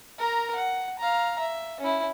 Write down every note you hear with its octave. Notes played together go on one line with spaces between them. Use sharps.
A#4 A#5
F#5
F5 A#5
E5
C#4 E4